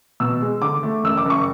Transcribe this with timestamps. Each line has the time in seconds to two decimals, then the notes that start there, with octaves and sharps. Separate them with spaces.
0.20 B2 E6
0.41 G#3
0.61 D3 D6
0.83 A3
1.04 F#1 E6
1.17 D6
1.25 F#1 C#6